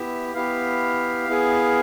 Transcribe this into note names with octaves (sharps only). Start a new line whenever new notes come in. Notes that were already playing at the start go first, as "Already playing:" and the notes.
Already playing: B3 E4 G4 E5
B3 E4 G4 F5
B3 E4 G#4